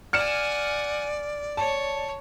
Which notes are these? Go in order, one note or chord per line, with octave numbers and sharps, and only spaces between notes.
D5 F#5 G#5 F6 C#7 E7
C#5 A5